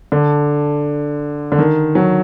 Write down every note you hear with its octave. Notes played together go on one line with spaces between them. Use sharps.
D3
D3
D#3
F#3